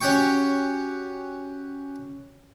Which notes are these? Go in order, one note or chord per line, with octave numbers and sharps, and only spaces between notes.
C#4 F#4 G4 G5 C#6